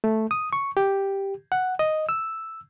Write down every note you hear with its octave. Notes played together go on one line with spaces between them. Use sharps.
A3
D#6
C#6
G4
F#5
D#5
E6